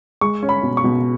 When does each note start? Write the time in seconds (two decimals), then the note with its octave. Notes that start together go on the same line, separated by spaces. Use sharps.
0.21 G#3 C#6
0.43 C#4
0.49 B5
0.63 B2
0.77 C#6
0.84 B2